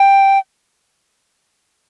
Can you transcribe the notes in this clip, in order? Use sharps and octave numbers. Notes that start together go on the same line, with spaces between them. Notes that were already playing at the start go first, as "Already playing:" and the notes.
Already playing: G5